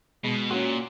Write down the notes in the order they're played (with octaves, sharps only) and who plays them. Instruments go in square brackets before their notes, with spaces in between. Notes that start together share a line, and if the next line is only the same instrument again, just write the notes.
[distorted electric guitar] B2 [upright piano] G#3
[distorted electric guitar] A#2 [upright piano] C#4 F#4